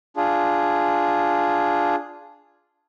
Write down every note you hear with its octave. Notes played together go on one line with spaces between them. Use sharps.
D4 F4 G#4